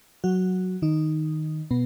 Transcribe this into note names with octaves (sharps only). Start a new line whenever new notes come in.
F#3 F#4
D#3 D#4
B2 B3